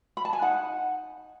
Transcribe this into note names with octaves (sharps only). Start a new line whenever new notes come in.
B5
A5
G#5
D#4 F#5